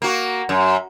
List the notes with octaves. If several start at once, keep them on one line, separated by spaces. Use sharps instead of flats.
A#3 F#4
F#2